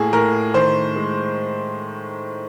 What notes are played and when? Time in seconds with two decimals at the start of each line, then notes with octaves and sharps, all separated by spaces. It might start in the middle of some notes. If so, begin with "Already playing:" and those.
Already playing: A2 A#3 G#4
0.13 A2 A#4
0.54 D#3 C5
0.96 G#3